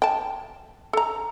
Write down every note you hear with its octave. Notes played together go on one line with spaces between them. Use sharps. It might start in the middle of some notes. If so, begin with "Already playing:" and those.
G5 A5
A4 A#5